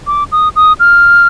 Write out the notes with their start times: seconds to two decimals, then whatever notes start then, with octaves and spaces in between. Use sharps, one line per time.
0.07 D6
0.32 D#6
0.56 D#6
0.80 F6